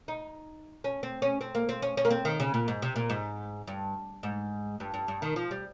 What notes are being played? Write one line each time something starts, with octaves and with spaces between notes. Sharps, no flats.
D#4
C#4
C4
C#4
C4
A#3
C4
C#4
C#4
A#3
C4
D#3
C#3
A#2
G#2
C3
A#2
G#2
G2
G#2
G2
G2
G2
D#3
F3
G3